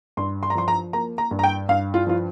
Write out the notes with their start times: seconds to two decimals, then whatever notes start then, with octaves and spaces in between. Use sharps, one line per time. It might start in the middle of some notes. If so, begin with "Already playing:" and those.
0.17 G2 C6
0.43 C6
0.50 A#5
0.55 F3 C6
0.68 A#5
0.93 A#3 A#5
1.18 A#5
1.31 G2
1.39 A#5
1.43 G5
1.69 G2 F5
1.94 F4
2.07 F3 F4